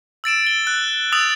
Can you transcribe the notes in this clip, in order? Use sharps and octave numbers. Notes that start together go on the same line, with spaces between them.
E6 A6 D7 E7
G7
F#6
D#6 E6 A6 F7